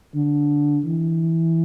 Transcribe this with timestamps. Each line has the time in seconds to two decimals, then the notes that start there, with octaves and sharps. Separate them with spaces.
0.15 D3
0.86 E3